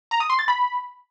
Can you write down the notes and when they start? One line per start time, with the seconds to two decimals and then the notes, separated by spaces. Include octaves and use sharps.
0.11 A#5
0.20 D#6
0.30 C6
0.39 A6
0.48 B5